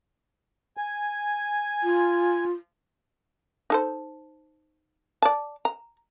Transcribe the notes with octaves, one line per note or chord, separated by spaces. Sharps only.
G#5
F4
D#4 A4 C5
D5 A5
A#5